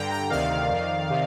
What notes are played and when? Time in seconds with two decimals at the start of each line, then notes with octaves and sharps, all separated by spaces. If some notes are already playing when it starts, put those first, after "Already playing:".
Already playing: G2 D3 G5 A#5
0.10 G5 A#5
0.30 D2 C3 D#3 D5 F5
0.69 F2 D#3
1.10 C3 D#3